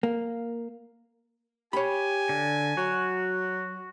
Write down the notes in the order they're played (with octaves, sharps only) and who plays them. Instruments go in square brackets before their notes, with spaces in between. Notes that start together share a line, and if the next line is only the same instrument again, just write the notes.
[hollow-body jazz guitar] A#3
[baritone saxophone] G4 [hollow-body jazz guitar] C#5 B5 [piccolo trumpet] G#5
[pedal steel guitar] D3
[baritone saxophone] F#3 [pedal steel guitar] F#4